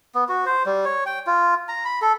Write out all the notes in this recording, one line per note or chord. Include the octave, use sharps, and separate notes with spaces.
B3
F#4
C5
G3
C#5
G5
F4
A#5
B5
A4